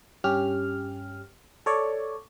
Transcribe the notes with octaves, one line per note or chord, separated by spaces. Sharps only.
G2 C#4 G4 F6
A4 C#5 D5